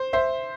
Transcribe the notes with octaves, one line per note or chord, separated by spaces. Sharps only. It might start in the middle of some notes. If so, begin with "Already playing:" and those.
Already playing: C5
C5 E5